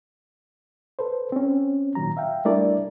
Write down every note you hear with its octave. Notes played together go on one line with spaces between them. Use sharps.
A4 B4 C5
C4 C#4
A#2 D#3 F#3 A#5
E5 F5 G5
G3 A3 D4 E4 A#4 D5